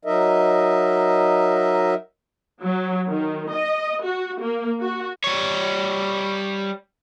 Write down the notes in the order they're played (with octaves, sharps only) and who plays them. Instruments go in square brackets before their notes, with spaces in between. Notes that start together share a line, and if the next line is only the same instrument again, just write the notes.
[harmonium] F#3 D#4 A#4 D#5 E5
[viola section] F#3
D#3
D#5
F#4
A#3
F#4
[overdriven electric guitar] G3 C#5